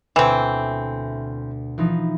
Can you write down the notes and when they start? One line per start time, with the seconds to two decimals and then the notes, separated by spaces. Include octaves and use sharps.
0.16 D2 B2 E3 C4
1.78 E3 F3 D#4